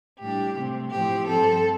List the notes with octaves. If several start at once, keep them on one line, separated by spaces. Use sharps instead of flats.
A2 G3 D4 G4
C3 A3 C4
A2 F3 C4 G4
G2 F3 C4 A4